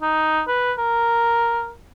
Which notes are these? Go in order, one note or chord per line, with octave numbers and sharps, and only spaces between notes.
D#4
B4
A#4